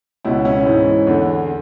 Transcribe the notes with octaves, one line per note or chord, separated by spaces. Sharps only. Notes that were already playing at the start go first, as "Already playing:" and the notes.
C#2 B2 C#4 E4
C#4 E4
G#2 E3
E2 D3